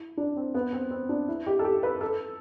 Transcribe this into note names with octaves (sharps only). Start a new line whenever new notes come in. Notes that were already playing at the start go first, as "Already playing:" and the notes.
Already playing: E4
D4
C4
B3
C4
C4
D4
E4
G4
A4
G4
B4
A4